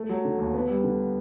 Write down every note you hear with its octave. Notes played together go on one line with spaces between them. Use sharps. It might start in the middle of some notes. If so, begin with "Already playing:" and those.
Already playing: A3
F#3
D3
D#2
B3
G3
D3